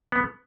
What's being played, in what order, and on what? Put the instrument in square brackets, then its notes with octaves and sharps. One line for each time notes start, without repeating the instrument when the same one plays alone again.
[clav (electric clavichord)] B3